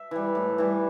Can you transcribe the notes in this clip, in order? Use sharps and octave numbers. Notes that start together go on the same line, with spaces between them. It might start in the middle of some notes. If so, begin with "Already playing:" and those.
Already playing: E5
E3 G3
A2
E3 G3